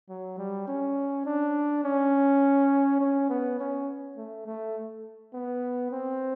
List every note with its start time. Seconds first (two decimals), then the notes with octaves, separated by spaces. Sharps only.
0.09 F#3
0.38 G3
0.68 C#4
1.26 D4
1.84 C#4
3.01 C#4
3.30 B3
3.59 C#4
4.17 A3
4.46 A3
5.34 B3
5.91 C4